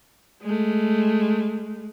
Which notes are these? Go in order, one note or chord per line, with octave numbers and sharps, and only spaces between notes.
G#3 A3